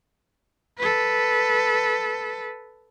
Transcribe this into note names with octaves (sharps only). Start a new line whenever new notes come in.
A4 B4